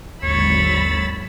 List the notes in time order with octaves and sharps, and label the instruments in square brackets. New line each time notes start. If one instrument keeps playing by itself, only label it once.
[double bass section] G#1 D3 F#3 [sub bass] D#2 [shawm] C#5 [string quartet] B5 E6 A6